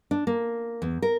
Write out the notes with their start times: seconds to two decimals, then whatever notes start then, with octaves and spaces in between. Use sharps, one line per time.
0.11 D4
0.27 A#3
0.82 E2
1.02 A#4